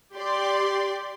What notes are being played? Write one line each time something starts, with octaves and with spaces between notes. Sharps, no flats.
G4 D5 C6